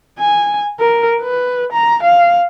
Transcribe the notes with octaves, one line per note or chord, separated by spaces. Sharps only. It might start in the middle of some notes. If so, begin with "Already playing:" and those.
G#5
A#4
B4
A#5
F5